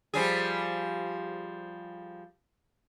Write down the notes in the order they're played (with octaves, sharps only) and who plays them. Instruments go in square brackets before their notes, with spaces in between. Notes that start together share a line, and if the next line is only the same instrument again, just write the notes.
[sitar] F3 G3 G#4